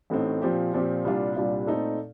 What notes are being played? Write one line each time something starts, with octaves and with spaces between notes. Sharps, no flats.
A1 A2 A3 C4 D#4
A#2 F3 C4 G4
A#2 F3 C4 G4
C2 A#2 G3 D4 F4
C2 A#2 G3 D4 F4
A#2 A3 C4 D#4 A4